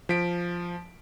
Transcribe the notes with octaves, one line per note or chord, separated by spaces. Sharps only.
F3 B6 D7